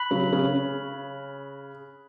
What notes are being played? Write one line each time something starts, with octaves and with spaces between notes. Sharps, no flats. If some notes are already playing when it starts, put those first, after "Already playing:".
Already playing: B5 F#6 B6 F#7
C#3 F#3
C#3